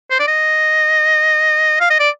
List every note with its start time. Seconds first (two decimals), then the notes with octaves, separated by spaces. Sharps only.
0.11 C5
0.20 D5
0.28 D#5
1.80 F5
1.90 D#5
2.00 D5